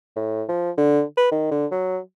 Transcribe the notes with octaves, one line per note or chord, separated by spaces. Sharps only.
A2
F3
D3
B4
D#3
D3
F#3